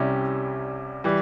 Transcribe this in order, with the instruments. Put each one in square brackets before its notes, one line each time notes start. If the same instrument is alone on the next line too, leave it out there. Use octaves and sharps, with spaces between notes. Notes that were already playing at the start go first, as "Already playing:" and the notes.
Already playing: [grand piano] C2 C3 G3 C#4 E4
E3 G3